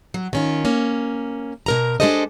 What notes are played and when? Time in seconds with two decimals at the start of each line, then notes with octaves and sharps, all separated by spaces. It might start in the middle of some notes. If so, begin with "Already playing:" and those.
0.14 F#3
0.33 D#3 C#4 F4
0.65 A#3 C#4
1.66 B2 A#4 A#5
2.00 G#3 D4 G4 A4 C5 D#5